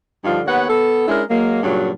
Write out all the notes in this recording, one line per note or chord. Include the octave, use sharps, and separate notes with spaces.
G2 D3 F3 D#4 F4
D#2 B3 C#5 F#5
B3 A4
G#3 C#4 D4 E4 A#4
F#3 G#3 A#3
G2 A#2 C#3 F#3